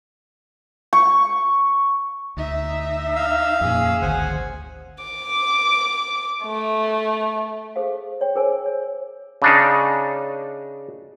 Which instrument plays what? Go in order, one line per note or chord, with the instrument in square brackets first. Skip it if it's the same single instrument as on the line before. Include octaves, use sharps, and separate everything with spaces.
[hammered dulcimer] C#6
[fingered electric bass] D2 [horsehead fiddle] D#4 E5
[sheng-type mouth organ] F5 E6
[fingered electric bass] F2 A#2 [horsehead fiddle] C#4 G#4
[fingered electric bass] G#1 D2 D#3 [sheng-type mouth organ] C5 F#5 G#5
[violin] D6
A3
[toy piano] G#4 A4 C5 F5
C#5 G5
G#4 A#4 C5 G#5
C#5
[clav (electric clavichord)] C#3 D4 D#4